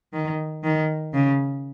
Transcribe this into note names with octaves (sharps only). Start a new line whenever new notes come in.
D#3
D#3
C#3